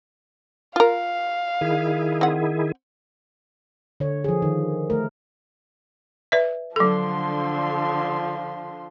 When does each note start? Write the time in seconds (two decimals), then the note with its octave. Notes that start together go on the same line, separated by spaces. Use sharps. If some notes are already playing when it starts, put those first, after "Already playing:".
0.76 F4 A#4 F5
1.61 D#3 E4 G#4
2.21 C4 F#5
4.00 D3 C#5
4.24 F3 G#4
4.42 D#3
4.90 A3 A#4
6.32 B4 D5 E5
6.76 D3 F3 F#3 A4 C6